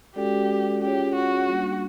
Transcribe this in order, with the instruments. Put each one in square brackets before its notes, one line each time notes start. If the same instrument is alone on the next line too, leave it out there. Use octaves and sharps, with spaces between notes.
[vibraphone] G#3 C#4 F#4 A4 D5 [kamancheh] G4
[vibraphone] C#4 F4 G#4 C#5 [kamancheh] G4
[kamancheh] F#4
[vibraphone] G3 A#3 D4